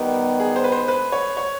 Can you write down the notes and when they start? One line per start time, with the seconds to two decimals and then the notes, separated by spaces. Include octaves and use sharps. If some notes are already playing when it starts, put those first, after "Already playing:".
Already playing: D#3 G3 B3 D#4
0.40 G#4
0.56 C5
0.64 B4
0.72 C5
0.88 B4
1.12 C#5
1.37 C#5